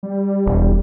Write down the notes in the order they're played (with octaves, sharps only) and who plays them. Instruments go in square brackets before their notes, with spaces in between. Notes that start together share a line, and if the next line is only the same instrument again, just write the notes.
[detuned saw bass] G3
[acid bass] E1